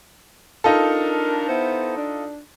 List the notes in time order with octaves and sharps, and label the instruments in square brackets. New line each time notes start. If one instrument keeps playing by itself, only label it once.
[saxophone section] D4 A#4 [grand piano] D#4 F4 A4
[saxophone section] B3 E4 C5
D4